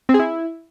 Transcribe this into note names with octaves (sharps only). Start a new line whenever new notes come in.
C4
G#4
E4